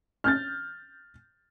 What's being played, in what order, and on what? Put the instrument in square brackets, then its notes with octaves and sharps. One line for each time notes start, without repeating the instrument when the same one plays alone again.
[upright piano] F6 G6 A6